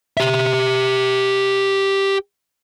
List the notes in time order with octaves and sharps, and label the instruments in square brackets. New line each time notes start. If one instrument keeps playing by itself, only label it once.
[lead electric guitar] G4 E5